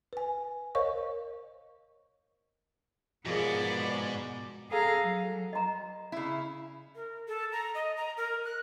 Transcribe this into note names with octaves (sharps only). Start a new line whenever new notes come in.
B4 G#5
A#4 C5 C#5 D#5 F5 C#6
G#2 B2 F3 B3 G#4 A#4 D5
G#4 A4 F5 A#5
F#3
D#5 A#5
C#3 E4
A#4
A4
A#5
D#5
A#5
A#4
F#6